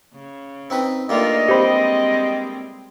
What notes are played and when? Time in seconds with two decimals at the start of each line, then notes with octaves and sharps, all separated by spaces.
0.13 C#3
0.70 C4 D#4 B4
1.09 G2 A3 A#3 D#4 F4 D5 D#5
1.49 G3 G#3 C4 G4 C5 B5